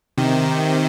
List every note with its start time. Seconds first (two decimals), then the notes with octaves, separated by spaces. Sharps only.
0.18 C3 D#3